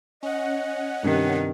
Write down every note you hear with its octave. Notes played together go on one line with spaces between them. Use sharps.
C#4 D#5 F#5
G2 C3 D#3 G3